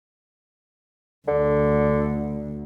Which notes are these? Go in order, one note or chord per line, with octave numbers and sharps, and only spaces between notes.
D2 D3